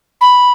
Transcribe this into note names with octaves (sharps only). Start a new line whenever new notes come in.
B5